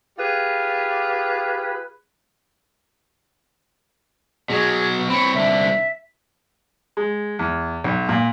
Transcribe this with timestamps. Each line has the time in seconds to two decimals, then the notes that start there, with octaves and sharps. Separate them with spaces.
0.18 F4 G4 G#4 B4
4.50 B2 F#3 G#4
5.10 C4 C#5 B5
5.35 C2 D3 E5
6.97 G#3
7.39 E2
7.84 B1
8.09 A#2